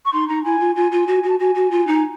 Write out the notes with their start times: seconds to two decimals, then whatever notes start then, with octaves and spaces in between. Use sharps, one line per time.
0.05 C#6
0.12 D#4 C6
0.28 D#4 A#5
0.44 E4 G#5
0.59 F4
0.75 F4 G#5
0.91 F4
1.07 F#4
1.23 F#4
1.29 A5
1.39 F#4 G#5
1.54 F#4
1.70 F4
1.87 D#4
1.95 G#5